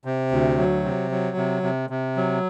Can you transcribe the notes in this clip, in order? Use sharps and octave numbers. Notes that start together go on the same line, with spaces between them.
C3
D2
F#3
C3
F#3
C3
C3
C3
F#3